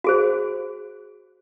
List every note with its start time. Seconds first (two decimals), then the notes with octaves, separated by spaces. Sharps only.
0.04 F#4 G#4 C5